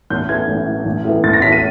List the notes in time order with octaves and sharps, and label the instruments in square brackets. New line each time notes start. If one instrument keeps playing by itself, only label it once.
[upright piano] A1 G6
A2 E3 G#6
A1
A2 E3
A1
A2 E3
A1 A6
A#6
A2 E3 B6
D#7